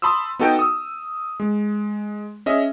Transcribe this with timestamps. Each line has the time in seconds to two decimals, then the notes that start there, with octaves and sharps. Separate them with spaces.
0.02 A5 B5 C6 D#6 E6
0.39 B3 D#4 F#4 A4 D#5 G5
0.59 D#6 E6
1.40 G#3
2.46 C#4 G#4 D#5 E5